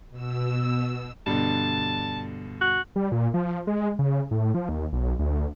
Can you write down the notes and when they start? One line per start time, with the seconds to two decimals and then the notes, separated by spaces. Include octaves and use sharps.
0.10 B2 E6
1.26 G2 B2 D3 A5
2.61 F#4
2.96 G3
3.12 A#2
3.34 F3
3.67 G#3
3.99 C#3
4.31 A2
4.54 F3
4.69 D#2
4.93 B1
5.19 D2